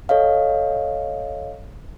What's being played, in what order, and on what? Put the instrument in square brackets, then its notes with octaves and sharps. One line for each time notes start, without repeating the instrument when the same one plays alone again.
[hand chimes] A4 C#5 D#5 F5